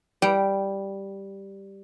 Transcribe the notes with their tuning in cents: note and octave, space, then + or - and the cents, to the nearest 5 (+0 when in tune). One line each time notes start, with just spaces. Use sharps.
G3 +0 G5 -10